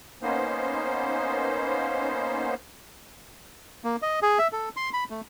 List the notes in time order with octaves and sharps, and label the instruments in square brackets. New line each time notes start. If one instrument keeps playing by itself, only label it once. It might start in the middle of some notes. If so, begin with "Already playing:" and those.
[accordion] A#3 B3 C#4 D#4 C5
[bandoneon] A#3
D#5
G#4
E5
A4
C6
B5
A3